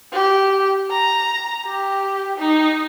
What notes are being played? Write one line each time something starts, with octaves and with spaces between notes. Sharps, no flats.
G4
A#5
G4
D#4